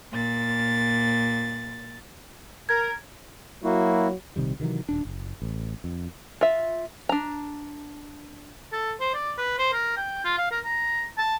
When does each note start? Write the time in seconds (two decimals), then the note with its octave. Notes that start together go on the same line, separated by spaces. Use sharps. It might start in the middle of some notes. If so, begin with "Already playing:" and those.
0.12 A#2 A6
2.69 A#4 G#6
3.64 F#3 A#3 E4 F#4
4.36 A#1 C3 D#3 G3
4.60 C3 D#3 E3 F#3
4.89 D#1 D4
5.05 F#1
5.42 A1
5.84 F2
6.41 F4 E5
7.09 D4 A#5
8.72 A4
9.00 C5
9.14 D5
9.38 B4
9.58 C5
9.73 A#4
9.97 G5
10.25 F4
10.38 F5
10.51 A#4
10.65 A#5
11.18 A5